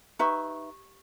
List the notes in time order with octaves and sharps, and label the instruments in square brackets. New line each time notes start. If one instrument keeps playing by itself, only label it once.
[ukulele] D#4 B4 E5 [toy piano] G4 C#6